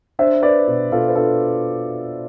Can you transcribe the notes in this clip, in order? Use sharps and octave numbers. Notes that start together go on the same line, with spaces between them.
D4 C5 E5
D4 B4 D5
B2
B2 F4 A4
B4
D4 F4 A4